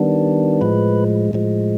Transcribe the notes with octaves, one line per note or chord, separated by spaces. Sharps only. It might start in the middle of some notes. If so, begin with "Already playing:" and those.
Already playing: D#3 G3 B3 D4
A2 F3 G#3 B4
A2 F3 G#3